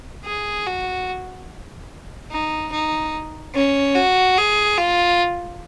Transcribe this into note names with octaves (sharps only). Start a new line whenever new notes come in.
G#4
F#4
D#4
D#4
C#4
F#4
G#4
F4